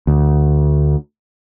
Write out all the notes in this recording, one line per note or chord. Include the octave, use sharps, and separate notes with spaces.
D2